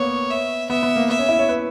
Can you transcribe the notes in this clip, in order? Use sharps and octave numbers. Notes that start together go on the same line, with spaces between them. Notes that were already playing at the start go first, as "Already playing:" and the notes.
Already playing: A#3 B3 C#5
E5
B3 E5
B3
A#3
B3 E5
C#4
E4
C#5
B4